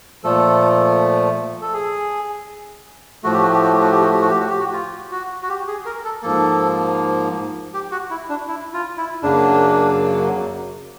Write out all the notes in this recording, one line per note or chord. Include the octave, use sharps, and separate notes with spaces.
A#2 F3 A3 A4
A4
G#4
A2 F3 A3 F#4
G4
F#4
G4
F#4
G4
F#4
G4
F#4
G4
F#4
G4
F#4
G4
F#4
F4
F#4
F#4
G4
G#4
A#4
A4
G#2 F3 A#3 A4
G4
F#4
E4
D4
E4
F4
E4
F#2 C#3 F#3 A#3 D4